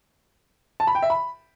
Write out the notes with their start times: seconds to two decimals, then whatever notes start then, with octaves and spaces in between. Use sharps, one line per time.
0.80 A5
0.87 B5
0.95 G5
1.02 E5
1.10 B5